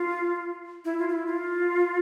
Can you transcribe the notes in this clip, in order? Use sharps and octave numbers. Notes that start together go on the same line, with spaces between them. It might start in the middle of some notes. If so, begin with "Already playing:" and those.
Already playing: F4
E4
F4
F4
E4
F4